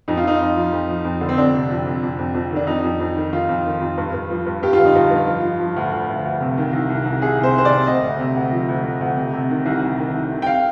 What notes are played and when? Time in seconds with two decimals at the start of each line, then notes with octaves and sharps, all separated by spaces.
0.08 F2 D#4
0.17 F4
0.24 F2 D#4
0.40 F2
0.57 F3
0.72 F2
0.89 F3
1.05 F2
1.21 D3
1.29 C4
1.38 F2 D4
1.54 C3
1.70 F2
1.86 F2
2.03 F2
2.19 F2
2.34 F2
2.51 D#3
2.56 D4
2.67 F2 D#4
2.84 F2
3.00 F2
3.16 D#3
3.33 D#3 F4
3.49 F2
3.65 D#3
3.81 F2
3.97 G2
4.13 G2
4.30 F3
4.46 G2
4.63 G2 G4
4.73 D3 F4
4.85 D#4
4.95 G2 F4
5.11 G2
5.28 F3
5.43 F3
5.60 F3
5.76 D2
5.92 D2
6.09 D2
6.25 D2
6.41 C3
6.57 D#3
6.73 C2
6.90 C2
7.05 C2
7.22 C2 G#4
7.38 C3
7.43 C5
7.55 D#3 C5
7.65 D5
7.71 C3
7.86 D2 D#5
8.03 D2
8.20 C3
8.36 D2
8.52 F3
8.68 D2
8.84 D2
9.01 D2
9.17 C3
9.33 C3
9.50 D#3
9.66 C2
9.81 C2
9.98 D#3
10.14 C2
10.31 D#3
10.42 G5
10.46 F5